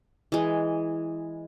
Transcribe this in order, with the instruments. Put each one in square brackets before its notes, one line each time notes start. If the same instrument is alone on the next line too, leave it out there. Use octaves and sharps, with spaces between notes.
[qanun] E3 G#3